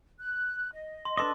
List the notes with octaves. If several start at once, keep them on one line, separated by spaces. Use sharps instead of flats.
F#6
D#5
C6
D4 A4 B4 D#5 C6 D6